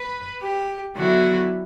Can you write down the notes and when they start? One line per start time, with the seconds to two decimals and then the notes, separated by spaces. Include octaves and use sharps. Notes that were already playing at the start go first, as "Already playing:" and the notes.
Already playing: B4
0.41 G4
0.96 D3 F#3 B3 E4 F#4